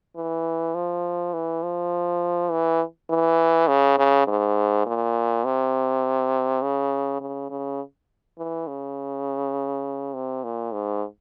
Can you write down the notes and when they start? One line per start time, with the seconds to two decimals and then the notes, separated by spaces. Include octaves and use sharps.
0.16 E3
0.74 F3
1.33 E3
1.62 F3
2.51 E3
3.10 E3
3.68 C#3
3.98 C#3
4.27 G#2
4.86 A#2
5.45 C3
6.62 C#3
7.20 C#3
7.50 C#3
8.38 E3
8.67 C#3
10.14 C3
10.44 A#2
10.73 G#2